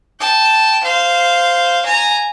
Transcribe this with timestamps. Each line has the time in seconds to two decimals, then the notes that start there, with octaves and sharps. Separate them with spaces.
0.20 G5 A5
0.84 C5 F5
1.85 G#5 A#5